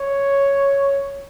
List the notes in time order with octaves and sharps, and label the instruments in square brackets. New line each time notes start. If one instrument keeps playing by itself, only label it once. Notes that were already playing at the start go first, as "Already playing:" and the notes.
Already playing: [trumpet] C#5